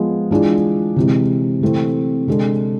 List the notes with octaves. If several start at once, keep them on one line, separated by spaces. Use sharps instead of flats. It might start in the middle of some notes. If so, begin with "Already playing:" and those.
Already playing: F3 G#3 B3
E3 G#3 D4 F4 G#4
C3 E3 G#3
C3 E3 A3 C4
C3 G#3 D4 A4